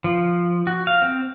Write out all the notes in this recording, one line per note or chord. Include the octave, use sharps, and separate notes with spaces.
F3
F#4
F5
C4